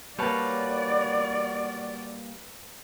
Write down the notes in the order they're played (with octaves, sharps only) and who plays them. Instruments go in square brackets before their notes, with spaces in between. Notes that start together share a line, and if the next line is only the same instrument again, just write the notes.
[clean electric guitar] G3 A#3 [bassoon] F#4 [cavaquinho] B4 C#5 A5 [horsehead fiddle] D5